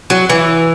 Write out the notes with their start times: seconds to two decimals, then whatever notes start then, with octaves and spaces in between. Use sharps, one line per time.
0.10 F#3
0.30 E3